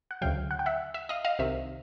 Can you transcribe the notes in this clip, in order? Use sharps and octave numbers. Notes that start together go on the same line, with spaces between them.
F#5
D2 C#3 F#3 F5 G5
F#5
G5
E5 F#5
E5
D#5 F5
D#5 F5
C2 C3 D#3 E5